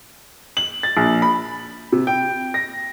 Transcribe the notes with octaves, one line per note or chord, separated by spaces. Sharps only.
F#7
A6
A#1
B5
C3
G5
A#6